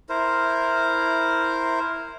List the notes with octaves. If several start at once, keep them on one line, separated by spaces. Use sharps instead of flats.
E4 A#4 C5